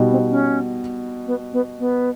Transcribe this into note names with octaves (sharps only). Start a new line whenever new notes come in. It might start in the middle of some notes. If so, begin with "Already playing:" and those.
Already playing: B2 G3 B3 D#4 G4
C4
C#4
B3
B3
B3